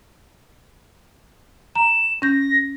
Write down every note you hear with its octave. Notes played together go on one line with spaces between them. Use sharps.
A#5 E7
C#4 G6 A#6